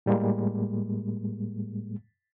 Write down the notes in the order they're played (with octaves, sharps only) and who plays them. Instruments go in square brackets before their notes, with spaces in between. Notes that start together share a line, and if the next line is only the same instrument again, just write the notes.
[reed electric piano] A2 G3 G#3 A#3